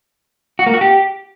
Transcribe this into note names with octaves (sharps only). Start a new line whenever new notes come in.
F#4
A#3
F#4
G4